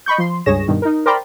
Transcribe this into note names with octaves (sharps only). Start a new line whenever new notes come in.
D#5 B5 C#6 G6
F3 C6
C#2 G2 G#4 C#5 A#6 E7
G2 B2 D#3
D#4 A#4
A#4 C5 D5 G5 A#5 B5